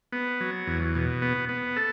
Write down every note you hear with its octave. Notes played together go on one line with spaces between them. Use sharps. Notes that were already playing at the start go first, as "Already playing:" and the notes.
B3
F#3
E2
B2
B3
B3
A4